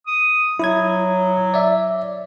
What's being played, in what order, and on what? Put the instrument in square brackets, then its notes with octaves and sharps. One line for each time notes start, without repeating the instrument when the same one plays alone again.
[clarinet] D#6
[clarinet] F#3 [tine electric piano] E4 D#6 G#6
[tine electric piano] D5 E5